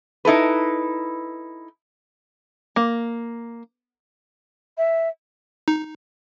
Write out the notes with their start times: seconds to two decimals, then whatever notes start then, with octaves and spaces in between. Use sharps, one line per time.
0.25 D#4 E4 A4 B4
2.76 A#3
4.77 E5
5.68 D#4